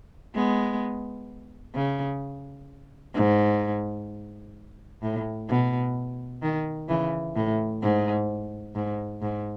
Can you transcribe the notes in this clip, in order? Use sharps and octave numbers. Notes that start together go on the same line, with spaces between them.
G#3 B3
C#3
G#2
A2
B2
D#3
C#3 E3
A2
G#2
G#2
G#2